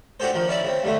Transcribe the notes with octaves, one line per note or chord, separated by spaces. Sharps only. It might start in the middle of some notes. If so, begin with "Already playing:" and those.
D4 F#4 G4 A4 C5
D#3 F3
C#4 E4 D5 E5
C#3 C4
G2 D3 A3